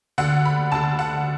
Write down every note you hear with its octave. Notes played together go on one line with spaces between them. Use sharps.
D2 D3 F#5
B5
D2 D3 A5
F#5